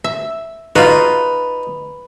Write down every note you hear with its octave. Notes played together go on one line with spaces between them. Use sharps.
E5
D#4 F4 F#4 B4